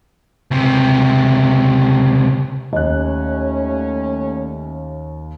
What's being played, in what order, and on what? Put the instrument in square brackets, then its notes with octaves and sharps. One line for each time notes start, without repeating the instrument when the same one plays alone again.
[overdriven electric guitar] C#2 C3
[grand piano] D#2 F#6 [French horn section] G3 A3 C#4 [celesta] D#5